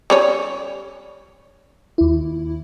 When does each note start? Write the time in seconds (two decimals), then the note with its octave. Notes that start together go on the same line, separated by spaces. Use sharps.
0.10 G3 C#4 C#5
1.98 D#2 E4